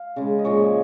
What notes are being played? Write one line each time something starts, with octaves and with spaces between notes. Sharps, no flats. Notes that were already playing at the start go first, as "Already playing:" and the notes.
Already playing: F5
C#3 G#3
D#5
A#2 F3 G#3 C#5